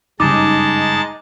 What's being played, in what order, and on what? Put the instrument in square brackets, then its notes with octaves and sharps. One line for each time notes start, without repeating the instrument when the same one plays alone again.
[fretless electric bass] F#1 G2 C#3 [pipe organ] G#3 A5 A6 [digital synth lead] D#4 [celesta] D6